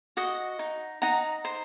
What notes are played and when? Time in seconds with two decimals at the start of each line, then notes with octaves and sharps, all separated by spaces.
0.17 F#4 D#5 F#5
0.59 D#4
1.02 D#4 F#5 A#5
1.45 C5